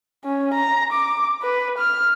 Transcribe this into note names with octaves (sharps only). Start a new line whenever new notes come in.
C#4
A#5
D6
B4
F6